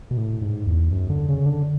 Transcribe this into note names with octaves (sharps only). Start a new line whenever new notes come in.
B2
A2
G#2
E2
F#2
D3
C#3
D3